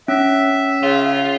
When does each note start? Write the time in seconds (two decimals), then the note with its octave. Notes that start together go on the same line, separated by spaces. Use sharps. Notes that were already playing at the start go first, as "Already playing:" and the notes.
0.08 C#4 E5
0.83 C#3 F4